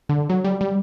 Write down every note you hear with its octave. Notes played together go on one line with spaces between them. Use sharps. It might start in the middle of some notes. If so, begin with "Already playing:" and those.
D3
F#3
G3
G3